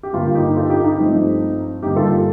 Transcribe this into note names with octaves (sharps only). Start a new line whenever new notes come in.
G4
G2 D3 G3 A#3 F4
D#4 G4
F4 A4
D#4 G4
D#4
G2 F3 A3 C4
G2 D3 G3 A#3 D#4 G4
F4 A4